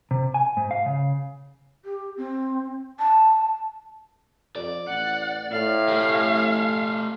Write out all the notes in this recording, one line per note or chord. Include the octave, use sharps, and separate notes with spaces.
C3
G#5
G#2
F5
C#3
G4
C4
A5
F2 D5
A1 F#5
A2 F5
A3 G4